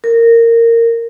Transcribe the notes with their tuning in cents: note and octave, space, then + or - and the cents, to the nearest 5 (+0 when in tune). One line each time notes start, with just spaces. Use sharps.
A#4 -15